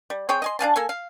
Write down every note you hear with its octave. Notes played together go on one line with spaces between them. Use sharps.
G3
C4 G#4 C#5 G5
D#5 G#5 C6
D4 F5 G#5 A5
A#3 A4 G#5
F5